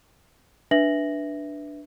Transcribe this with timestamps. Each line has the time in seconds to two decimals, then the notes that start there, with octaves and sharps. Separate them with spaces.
0.71 D4 B4 E5 A#6 F#7